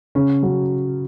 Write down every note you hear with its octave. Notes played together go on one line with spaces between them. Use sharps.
C#3 C#4
F#3 C#4